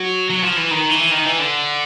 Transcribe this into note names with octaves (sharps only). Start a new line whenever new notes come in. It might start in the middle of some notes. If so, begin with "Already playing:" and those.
Already playing: F#3
F#3
F3
E3
D#3
E3
D#3
E3
D3